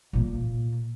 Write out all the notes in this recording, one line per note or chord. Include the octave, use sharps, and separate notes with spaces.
A#2 A#3